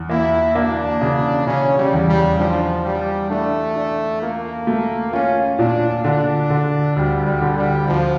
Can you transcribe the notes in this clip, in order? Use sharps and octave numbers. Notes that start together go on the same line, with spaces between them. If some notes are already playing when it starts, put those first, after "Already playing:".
Already playing: E2
A#3 E4
A#3 D4
C#3
C#3 C#4
G3
E2
G3
F3 D4
G3 F4
A3 D4
D4
A#3 F4
A3
C#4 F4
A#2 D4
D3 D4
D3
D2 G3
G3
D3
G3
D2 F3